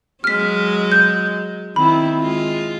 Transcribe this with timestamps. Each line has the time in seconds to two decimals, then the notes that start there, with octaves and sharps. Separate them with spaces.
0.24 F#3 G#3 F6 B6
0.92 G6
1.76 D#3 C4 E4 B5
2.18 G#3 F4